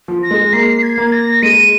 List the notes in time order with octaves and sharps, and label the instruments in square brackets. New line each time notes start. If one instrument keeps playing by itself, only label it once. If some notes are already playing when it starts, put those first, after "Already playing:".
[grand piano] F3
[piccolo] A#6
[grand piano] G#3
[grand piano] A#3 [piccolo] C7
[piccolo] G#6
[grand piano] A#3
[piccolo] A#6
[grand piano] G#3 [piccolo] D#7